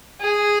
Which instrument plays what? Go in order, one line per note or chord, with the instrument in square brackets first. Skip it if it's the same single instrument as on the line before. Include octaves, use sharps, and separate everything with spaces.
[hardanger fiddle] G#4